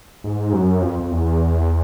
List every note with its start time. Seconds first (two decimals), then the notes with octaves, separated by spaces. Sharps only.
0.24 G#2
0.53 F#2
0.82 F2
1.00 F2
1.11 E2